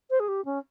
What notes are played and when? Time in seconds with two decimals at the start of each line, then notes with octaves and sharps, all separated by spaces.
0.10 C5
0.19 G#4
0.28 G4
0.45 C#4